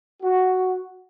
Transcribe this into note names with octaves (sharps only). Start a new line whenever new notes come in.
F#4